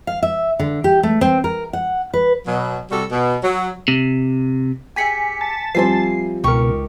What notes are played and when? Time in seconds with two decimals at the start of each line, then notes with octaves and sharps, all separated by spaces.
0.07 F5
0.23 E5
0.60 D3
0.84 G4
1.03 A3
1.21 C4
1.44 A#4
1.73 F#5
2.14 B4
2.47 B2 F#3
2.91 C3 G3 F#4 A4
3.11 B2
3.44 F#3
3.88 C3
4.96 G4 G#4 E5 G#5 B6 C#7
5.41 A5
5.75 F3 G3 C4 E5 G#5 C6 C7
6.44 C#2 B2 D#4 G4 A#4 C#6